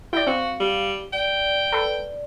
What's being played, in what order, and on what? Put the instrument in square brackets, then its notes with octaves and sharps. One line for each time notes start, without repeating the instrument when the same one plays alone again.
[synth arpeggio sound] E4 D5 [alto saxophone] G5
[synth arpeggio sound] C4 [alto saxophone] F#4 [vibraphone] F5
[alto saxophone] G3
[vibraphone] D5 [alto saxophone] G5
[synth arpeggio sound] A4 B4